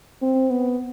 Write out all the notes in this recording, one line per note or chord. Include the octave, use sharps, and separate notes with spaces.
C4
B3